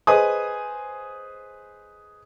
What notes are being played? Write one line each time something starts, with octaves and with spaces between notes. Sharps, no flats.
G#4 B4 C5 D#5 G#5 D#6